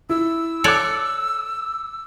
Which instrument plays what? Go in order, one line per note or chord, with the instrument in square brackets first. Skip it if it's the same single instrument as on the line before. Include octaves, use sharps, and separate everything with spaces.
[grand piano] E4 [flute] E6
[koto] A4 C#5 D5 [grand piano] D6 F#6 C#7